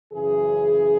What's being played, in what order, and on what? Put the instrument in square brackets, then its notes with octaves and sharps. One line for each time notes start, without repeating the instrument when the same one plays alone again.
[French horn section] F#2 C#3 E3 G#4